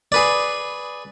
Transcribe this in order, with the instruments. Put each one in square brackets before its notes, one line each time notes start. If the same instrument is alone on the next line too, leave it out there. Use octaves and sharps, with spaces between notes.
[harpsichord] G#4 B4 D5